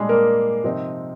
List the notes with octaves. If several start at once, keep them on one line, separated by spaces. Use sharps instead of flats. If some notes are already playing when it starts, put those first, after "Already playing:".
Already playing: A#2 G3 G#3 D4 G#4
A#3 A#4
C3 F3 C4 D#4